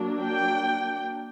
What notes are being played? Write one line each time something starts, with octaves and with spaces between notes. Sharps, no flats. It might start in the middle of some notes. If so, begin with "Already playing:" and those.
Already playing: F#3 A#3 D4
G5